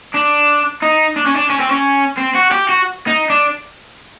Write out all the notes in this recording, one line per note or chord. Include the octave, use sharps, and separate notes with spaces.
D4
D#4
D4
C#4
D4
C#4
C4
C#4
C4
F#4
G4
F#4
D#4
D4